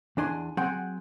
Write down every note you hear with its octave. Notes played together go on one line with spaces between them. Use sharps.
E2 D4 G#5 C6
F#3 C4 G#4 F#5 G5 C6